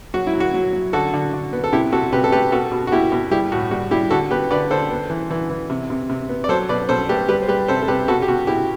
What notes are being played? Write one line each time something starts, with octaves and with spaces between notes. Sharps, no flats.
F#3 F#4
E4
F#3
F#4
F#3
F#3
D3 F#4 A4
D3
D3
B3
A4
C3 E4 G4
C3 F#4 A4
C3 G4 B4
A4
A3 G4 B4
B2 F#4 A4
B2
F#4
B2 E4 G4
B2
G3 E4 G4
A2 F#4
G3 F#4
G3 E4 G4
D3 F#4 A4
B3 G4 B4
D3 B4 D5
D3 A4 C5
B3
E3
E3
E3
C3
C3
C3
B3
D5
F#3 A4 C5
B2 B4 D5
B2 A4 C5
A3 G4 B4
G3 G4 B4
C5
G3 G4 B4
C3 A4 C5
A4
C3 G4 B4
B2 F#4 A4
G4
B2 F#4
B2 E4 G4